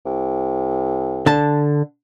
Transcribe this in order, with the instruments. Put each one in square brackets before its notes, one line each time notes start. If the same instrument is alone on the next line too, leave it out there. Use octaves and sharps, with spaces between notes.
[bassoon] C2
[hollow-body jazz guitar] D3 A5